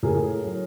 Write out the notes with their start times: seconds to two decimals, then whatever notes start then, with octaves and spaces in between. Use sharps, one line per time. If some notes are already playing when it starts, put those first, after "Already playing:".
0.03 A2 G#4 A#4
0.44 F#3